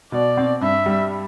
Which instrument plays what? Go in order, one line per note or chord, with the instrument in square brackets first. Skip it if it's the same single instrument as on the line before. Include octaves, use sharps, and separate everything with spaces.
[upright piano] B2 [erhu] D5
[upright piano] C4
[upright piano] G2 [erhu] E5
[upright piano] G3